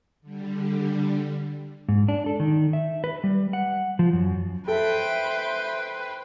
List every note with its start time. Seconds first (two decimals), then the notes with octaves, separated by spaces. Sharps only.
0.22 D3 G3
1.89 G#2
2.08 D4
2.26 A4
2.40 D#3
2.73 E5
3.04 B4
3.24 G3
3.53 F#5
3.99 F3
4.13 F#2
4.68 A4 B4 C5 E5 G5